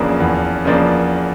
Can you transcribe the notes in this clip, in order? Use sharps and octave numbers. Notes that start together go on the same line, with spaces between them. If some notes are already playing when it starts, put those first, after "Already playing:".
Already playing: E2 C#3 F3 A#3 D4
E2
C#3 F3 A#3 D4